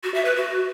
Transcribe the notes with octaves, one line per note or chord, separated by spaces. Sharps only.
F#4
E5
B4
F#4